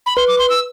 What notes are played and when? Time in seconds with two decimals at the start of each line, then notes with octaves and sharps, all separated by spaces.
0.06 B5
0.17 B4 C6
0.28 D6
0.39 C6
0.50 E6